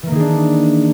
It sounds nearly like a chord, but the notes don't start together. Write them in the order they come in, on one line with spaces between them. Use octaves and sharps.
E3 A#3 D#3 G#4 D4